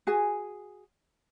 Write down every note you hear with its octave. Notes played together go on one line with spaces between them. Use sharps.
F#4 G#4 G#5